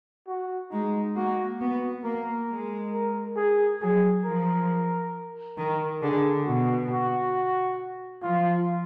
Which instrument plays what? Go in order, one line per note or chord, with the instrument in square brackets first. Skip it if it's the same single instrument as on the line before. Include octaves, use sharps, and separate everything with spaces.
[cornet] F#4
[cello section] G#3 [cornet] D#4
[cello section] A#3 [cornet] F#4
[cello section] B3 [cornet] F#4
[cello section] A#3 [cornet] A#4
[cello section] G#3
[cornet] A#4
G#4
[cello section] F#3 [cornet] G#4
[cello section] F3 [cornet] A#4
[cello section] D#3 [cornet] A#4
[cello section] D3 [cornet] G#4
[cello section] B2 [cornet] F#4
[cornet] F#4
[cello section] F3 [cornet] F4